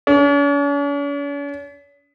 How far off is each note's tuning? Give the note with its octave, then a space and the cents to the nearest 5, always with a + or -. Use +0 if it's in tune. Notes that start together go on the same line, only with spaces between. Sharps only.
C#4 +45